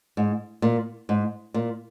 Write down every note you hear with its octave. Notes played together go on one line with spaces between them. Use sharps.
G#2
A#2
G#2
A#2